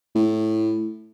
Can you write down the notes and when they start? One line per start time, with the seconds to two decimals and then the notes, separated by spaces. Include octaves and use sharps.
0.15 A2